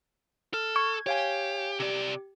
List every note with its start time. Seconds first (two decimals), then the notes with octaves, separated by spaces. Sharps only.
0.54 A4 F6
0.76 C#6 G#6
1.06 G4 C#5 F5 G#5
1.80 C3 G4 D5